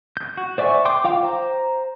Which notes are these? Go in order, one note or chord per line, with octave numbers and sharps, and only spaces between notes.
G6
F#4
C5 D5 E5 G#5 C#6
G5 C6 D6 G6
F4 F5 G5 D6
C5 A#5